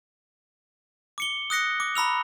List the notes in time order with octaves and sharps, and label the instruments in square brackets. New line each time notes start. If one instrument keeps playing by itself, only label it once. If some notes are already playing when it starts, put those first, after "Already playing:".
[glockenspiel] D6 C#7 G7
D#6 F#6 A#6 C#7
D6
A#5 B5 E6 F7